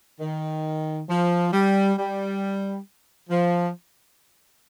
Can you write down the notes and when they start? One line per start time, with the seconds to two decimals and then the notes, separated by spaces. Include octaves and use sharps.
0.20 D#3
1.08 F3
1.52 G3
1.97 G3
3.29 F3